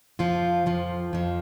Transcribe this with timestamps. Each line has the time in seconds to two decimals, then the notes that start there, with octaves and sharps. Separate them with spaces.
0.19 F2 F3 F4
0.66 F2 F3
1.13 F2 F3